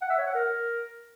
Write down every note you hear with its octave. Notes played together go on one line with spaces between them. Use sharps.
F#5
E5
C#5
F#5
A#4